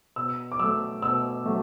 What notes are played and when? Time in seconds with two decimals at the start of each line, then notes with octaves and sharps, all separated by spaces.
0.16 B2 E6
0.52 D6
0.59 F#3 A3 E6
1.02 B2 E6
1.46 F#3 A3